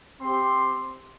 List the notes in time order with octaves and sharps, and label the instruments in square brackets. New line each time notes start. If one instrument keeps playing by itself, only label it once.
[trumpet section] C4 G4 C6